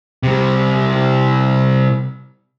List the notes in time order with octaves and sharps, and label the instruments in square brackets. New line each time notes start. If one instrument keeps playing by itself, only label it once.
[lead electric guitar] C3 G3